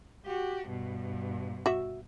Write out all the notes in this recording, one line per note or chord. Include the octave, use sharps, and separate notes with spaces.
F#4 G4
G2 B2
F#4 E5